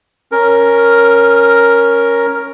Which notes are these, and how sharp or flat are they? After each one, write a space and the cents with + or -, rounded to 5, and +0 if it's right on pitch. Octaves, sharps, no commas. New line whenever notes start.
C#4 +0 A#4 +5